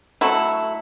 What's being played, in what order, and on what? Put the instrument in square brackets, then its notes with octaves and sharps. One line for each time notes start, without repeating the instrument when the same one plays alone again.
[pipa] F#3 A3 E4